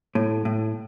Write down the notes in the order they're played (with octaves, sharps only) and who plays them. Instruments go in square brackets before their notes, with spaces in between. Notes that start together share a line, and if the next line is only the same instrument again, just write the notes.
[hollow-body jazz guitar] A2
A2